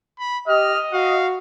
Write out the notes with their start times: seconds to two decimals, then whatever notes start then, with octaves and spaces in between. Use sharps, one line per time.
0.19 B5
0.48 G4 D#5 F6
0.93 F#4 F5